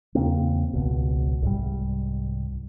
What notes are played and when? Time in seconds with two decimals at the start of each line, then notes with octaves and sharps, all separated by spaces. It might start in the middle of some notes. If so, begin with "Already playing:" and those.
0.15 E2 C#3 A#3 C4
0.73 G#1 C#2 B2
1.42 C2 G#2 G3